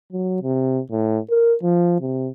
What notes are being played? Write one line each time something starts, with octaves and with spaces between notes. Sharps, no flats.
F#3
C3
A2
A#4
F3
C3